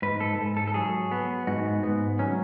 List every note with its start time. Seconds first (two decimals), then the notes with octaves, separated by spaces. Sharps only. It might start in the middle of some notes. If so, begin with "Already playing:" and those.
0.02 G#2 B4
0.20 A4
0.39 G#2
0.57 A4
0.67 A4
0.74 F#3 G#4
1.12 B3
1.47 G#2 F#4
1.83 G#2 B3
2.19 F#3 C#4